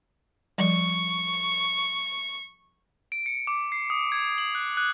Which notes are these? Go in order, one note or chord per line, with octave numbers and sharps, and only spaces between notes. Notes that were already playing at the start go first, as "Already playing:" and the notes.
F3 G3 C#6
D7
C#7
D6
C7
D#6
G#6
F#7
F#6
F#6